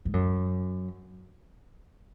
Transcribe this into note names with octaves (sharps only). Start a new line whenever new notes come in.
G#2
F#2